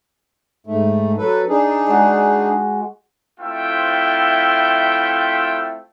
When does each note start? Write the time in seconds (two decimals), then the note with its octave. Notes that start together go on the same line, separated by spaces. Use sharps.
0.67 G#2 A3
1.18 F#3 A4 B4
1.49 D4 D#4 G#4
1.87 G#3 F#4
3.39 A3 C4 E4 F4 E5 G5